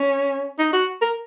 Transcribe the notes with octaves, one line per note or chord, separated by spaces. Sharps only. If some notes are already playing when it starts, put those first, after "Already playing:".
Already playing: C#4
D#4
F#4
A#4